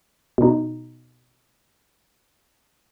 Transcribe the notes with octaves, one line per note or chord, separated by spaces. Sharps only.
B2 D#4